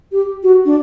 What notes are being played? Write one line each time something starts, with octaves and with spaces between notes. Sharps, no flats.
G4
F#4
D4